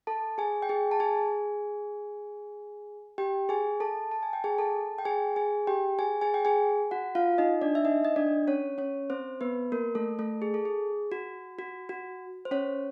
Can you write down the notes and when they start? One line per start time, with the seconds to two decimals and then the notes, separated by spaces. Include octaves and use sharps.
0.07 A4 A5
0.38 G#4 G#5
0.62 G5
0.69 G#4 G#5
0.91 A5
1.00 G#4 G#5
3.18 G4 G5
3.49 G#4 G#5
3.80 A4 A5
4.11 A5
4.23 G#5
4.33 G5
4.44 G#4 G#5
4.58 A4 A5
4.98 G5
5.05 G#4 G#5
5.36 G#4 G#5
5.67 G4 G5
5.98 G#4 G#5
6.21 G#4 G#5
6.34 G5
6.45 G#4 G#5
6.91 F#4 F#5
7.15 F4 F5
7.38 D#4 D#5
7.61 D4 D5
7.75 E5
7.85 D#4 D#5
8.05 D#5
8.16 D4 D5
8.47 C#4 C#5
8.78 C#4 C#5
9.10 C4 C5
9.41 B3 B4
9.72 A#3 A#4
9.95 A3 A4
10.19 A3 A4
10.42 G#4
10.54 A4
10.65 G#4
11.12 F#4
11.59 F#4
11.89 F#4
12.45 C5
12.51 C#4 C#5